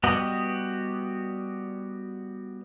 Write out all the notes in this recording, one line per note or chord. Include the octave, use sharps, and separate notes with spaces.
G3 B3 F#4 G4 D#5